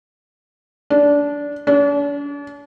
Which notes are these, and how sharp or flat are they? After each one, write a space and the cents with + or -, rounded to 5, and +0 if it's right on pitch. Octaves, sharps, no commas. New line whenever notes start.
D4 -20
D4 -45